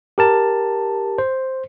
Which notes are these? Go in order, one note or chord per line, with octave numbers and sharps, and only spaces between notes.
G4 A#4 A5
C5